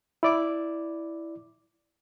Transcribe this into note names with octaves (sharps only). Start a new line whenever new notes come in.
E4 D5 D6